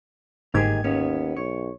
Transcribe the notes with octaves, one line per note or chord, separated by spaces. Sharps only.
G1 G#2 D#3 A#3 G4 G#4 G#6
D#2 B3 C#4
B1 C#5